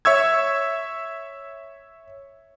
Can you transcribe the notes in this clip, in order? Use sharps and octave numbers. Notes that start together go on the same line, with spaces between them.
C#5 E5 C#6 E6 G#6